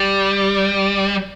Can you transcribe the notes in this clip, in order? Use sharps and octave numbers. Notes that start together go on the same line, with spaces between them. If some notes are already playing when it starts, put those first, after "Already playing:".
Already playing: G3